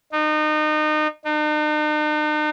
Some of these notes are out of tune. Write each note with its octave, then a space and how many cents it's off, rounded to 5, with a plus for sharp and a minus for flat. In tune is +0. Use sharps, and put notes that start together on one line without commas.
D#4 -30
D#4 -45